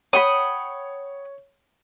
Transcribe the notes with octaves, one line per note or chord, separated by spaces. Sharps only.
C#5 F#5 G5 B5 D#6